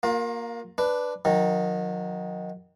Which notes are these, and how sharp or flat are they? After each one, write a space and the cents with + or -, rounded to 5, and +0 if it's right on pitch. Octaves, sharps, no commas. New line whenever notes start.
A#3 +0 F4 +40
D4 +0 B4 +5
D#3 +0 F#3 -30